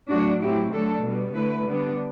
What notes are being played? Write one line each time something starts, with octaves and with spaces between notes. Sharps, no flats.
A2 F#3 A3 D4 F#4
A2 F#3 C4 E4 G4
D3 F#3 A3 D4 A4
B2 G3 B3
D3 A3 E4 B4
D3 G3 B3 D4